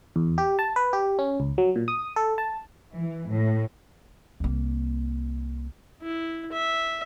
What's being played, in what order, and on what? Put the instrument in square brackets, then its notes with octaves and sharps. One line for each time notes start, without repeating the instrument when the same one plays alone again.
[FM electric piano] E2
G4
A5
B4
G4
C#4
C#2
F#3
A#2
D#6
A4
A5
[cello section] E3
A2
[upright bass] C2 A#3
[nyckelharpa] E4
E5